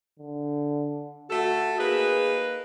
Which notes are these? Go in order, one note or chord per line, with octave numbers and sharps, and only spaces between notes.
D3
A3 F#4 A4
A#3 D#4 G#4 B4